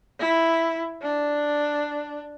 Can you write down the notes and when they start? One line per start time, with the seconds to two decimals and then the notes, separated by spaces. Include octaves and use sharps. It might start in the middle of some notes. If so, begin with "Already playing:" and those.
0.20 E4
1.02 D4